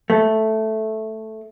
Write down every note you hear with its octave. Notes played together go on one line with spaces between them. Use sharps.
A3